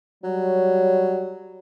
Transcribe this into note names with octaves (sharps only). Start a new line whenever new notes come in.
F#3 G3 C#5